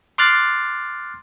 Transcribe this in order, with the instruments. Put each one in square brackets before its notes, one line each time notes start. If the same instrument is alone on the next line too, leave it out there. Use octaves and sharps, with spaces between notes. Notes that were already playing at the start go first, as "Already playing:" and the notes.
[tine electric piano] C6 D6 F6 F#6 A6 C7